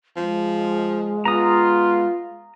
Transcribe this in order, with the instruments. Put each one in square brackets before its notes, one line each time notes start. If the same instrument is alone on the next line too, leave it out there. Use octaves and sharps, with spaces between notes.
[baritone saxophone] F3 [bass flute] G#3
[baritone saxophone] B3 [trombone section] F4 [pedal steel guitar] A#5 D#6